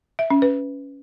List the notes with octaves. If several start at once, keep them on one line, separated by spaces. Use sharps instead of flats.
E5
C#4
B4